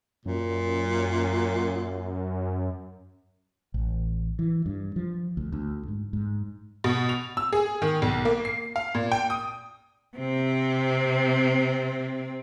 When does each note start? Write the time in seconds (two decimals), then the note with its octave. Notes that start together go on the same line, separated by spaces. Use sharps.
0.26 F#2 A#2
3.74 A1
4.39 E3
4.66 G2
4.96 F3
5.37 D2
5.52 D2
5.88 G#2
6.13 G#2
6.84 B2
7.09 F7
7.37 E6
7.53 G#4
7.82 D#3
8.02 B1
8.25 A#3
8.45 C7
8.76 F5
8.95 A#2
9.12 G5
9.30 D#6
10.18 C3 C4